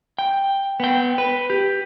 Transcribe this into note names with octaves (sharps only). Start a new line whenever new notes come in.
G5
B3 G5
B4
G4